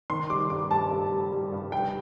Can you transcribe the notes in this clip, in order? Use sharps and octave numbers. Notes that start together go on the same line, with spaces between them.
D#3 C6
G3 D6
G2 D6
G2 A5
G2
G3
G3
G2
G2 G5